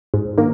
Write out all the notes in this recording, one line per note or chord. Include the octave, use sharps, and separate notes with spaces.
G#2
D#3 A#3